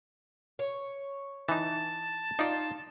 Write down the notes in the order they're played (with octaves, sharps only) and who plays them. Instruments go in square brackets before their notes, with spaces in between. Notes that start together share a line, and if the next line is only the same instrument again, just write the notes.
[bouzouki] C#5
[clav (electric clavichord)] E3 D#4 [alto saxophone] A5
[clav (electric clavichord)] D#4 D5 [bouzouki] F4